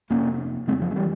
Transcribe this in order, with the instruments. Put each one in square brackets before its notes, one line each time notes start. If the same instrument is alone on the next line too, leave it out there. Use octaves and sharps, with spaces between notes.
[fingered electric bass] F2 C3 A#3 C#4
F2 C#3 G#3 C4
F3
G#3
E3 G3